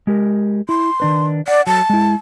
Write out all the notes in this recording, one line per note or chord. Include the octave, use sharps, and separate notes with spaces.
G#3 G4 A#4
E4 C6
D#3 D4 B4
D5 F#5
F#3 A5
G#3 E4